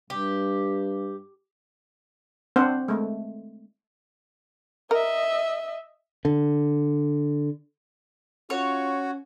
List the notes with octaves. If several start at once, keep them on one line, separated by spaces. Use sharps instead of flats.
G2 G4
C4 D4 C5 F#5
G#3 A3
A#4 D#5 E5
D3
C#4 F4 F#4 C#5